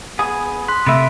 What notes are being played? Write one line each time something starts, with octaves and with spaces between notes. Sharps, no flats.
B3 G#4
C6 F#6 B6
C3 A3 E5 B5 D7